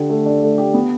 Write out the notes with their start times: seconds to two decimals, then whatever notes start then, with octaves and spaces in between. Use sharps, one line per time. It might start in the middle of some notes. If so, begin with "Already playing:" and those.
Already playing: D3 G4
0.10 A3
0.26 D4
0.42 A3
0.58 G4
0.74 B3